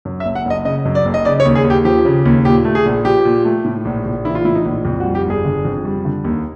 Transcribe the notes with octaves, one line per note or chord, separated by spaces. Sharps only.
F#2
E5
F#1
F#5
F#1
D#5
C#3 D#5
F#2
D5
F#1
D#5
C#3 D5
C#5
D#2
G#4
D#2
G4
F3 G4
C#3
D#2
A#2 G4
A3
G#4
A#1
F3 G4
A#2
A3
A2
A#1
A#1
E3 E4
F4
A2 E4
D#4
A#1
F2
F#4
G3
G4
G1 G#4
D3
F2
G3
D3
D#2